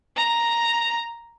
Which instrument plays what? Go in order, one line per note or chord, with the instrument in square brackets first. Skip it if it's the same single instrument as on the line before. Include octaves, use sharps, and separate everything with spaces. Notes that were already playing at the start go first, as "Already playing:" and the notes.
[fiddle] A#5